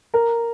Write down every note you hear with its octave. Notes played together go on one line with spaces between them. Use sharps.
A#4